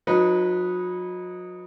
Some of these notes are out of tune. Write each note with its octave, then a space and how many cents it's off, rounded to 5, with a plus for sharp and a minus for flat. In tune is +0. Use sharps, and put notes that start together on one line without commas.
F#3 -40 D#4 +0 B4 -15